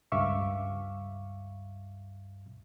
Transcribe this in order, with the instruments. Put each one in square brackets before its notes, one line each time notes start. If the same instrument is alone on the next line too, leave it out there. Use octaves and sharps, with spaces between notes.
[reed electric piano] C#2 G2 E5 F5 C#6 D6